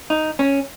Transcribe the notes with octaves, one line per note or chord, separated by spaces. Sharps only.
D#4
C#4